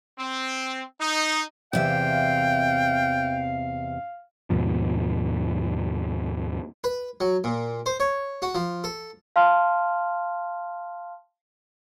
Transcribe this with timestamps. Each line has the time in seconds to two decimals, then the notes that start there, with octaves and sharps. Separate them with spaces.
0.19 C4
1.01 D#4
1.73 E2 C3 E5 F5 G5
4.50 D#2 G#2 B2 F3
6.84 B4
7.20 F#3
7.44 A#2
7.86 C5
8.00 C#5
8.42 F#4
8.55 F3
8.84 A4
9.36 F5 A5 C6 F6